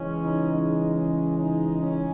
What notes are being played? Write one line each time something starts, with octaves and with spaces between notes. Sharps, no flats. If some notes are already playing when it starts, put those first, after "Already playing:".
Already playing: C#3 E3 G#3 C#4
D#4
D#4
C#4
D#4
C#4